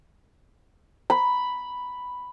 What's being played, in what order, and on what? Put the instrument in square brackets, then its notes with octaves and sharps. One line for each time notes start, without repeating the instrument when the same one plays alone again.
[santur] B5